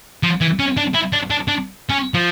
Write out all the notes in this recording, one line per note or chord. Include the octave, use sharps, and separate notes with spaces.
F3
E3
C#4
D4
E4
D4
D4
D4
C#4
F3